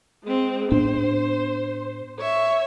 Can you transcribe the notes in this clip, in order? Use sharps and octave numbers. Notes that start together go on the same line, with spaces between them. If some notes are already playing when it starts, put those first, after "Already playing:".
G#3 C4
A2 B3 D4 C5
C#5 E5